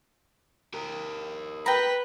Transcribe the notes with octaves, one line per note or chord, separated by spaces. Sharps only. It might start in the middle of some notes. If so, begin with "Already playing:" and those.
G4 A#4
B4 G5 A#5 B5